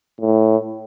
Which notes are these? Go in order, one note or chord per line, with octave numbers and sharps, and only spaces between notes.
A2